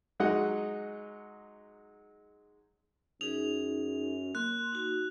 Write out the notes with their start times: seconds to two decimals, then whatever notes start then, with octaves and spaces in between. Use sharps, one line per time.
0.20 F#3 G#3 D#4 D#5 F#5
3.21 F#2 D#4 G#4 F7
4.35 A#3 C6 F#6
4.72 D#4 F#4